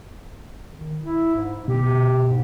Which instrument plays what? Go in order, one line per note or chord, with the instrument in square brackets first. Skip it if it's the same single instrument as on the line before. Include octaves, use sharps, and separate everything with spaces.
[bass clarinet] D#3
E4
G#2
[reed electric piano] B2 [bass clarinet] G4
[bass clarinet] G#2